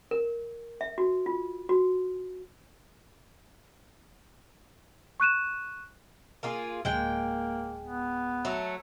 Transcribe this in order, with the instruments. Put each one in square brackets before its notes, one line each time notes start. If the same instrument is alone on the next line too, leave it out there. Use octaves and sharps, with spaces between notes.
[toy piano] A#4
E5
F#4
F4
F#4
[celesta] C#6 F#6 D#7 E7
[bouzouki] A#3 F4 G#4
[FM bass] D1 [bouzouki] G#3 G5 [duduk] A#3
[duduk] B3
[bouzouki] F#3 A3